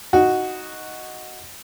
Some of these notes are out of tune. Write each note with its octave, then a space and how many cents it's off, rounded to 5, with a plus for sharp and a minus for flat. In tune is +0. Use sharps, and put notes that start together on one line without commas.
D#4 +0 F#4 +0